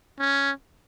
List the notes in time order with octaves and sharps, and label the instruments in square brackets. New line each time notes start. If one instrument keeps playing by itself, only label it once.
[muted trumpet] C#4